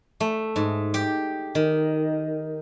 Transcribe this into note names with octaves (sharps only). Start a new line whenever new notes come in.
A3
G#2
G4
D#3